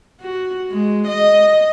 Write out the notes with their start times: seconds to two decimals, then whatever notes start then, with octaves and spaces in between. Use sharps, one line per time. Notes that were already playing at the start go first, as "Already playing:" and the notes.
0.21 F#4
0.70 G#3
1.07 D#5